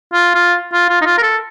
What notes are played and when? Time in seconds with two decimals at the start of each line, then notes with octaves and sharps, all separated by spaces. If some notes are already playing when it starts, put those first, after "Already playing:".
0.13 F4
0.35 F4
0.73 F4
0.89 F4
1.01 D#4
1.06 F4
1.18 A#4
1.22 A4